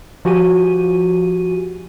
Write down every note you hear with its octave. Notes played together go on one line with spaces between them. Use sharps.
F3 F#4 G4 G#5 D#7